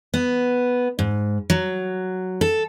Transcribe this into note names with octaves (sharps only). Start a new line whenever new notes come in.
B3
G#2
F#3
A4